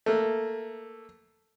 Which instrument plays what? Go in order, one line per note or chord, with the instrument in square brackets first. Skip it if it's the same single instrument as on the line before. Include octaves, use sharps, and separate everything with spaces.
[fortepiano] A3 A#3